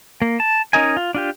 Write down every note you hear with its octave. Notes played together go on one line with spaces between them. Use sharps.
A#3
A5
C#4 D#4 A#4 D#5 G#5
F4
D4 F4 G4